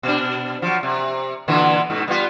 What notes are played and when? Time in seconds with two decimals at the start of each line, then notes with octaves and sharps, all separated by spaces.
0.03 B2 D4
0.62 F3 F#3
0.83 C3
1.48 A#2 D3 E3
1.90 G#2 B2
2.08 G3 B3 F4